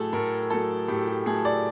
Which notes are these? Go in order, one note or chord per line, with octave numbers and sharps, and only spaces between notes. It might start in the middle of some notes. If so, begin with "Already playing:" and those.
Already playing: A2 F#3 A3 G#4 A4
A2 A#4
F#3 A3 A4
A2 G4
G4
F#3 A3 G#4
D5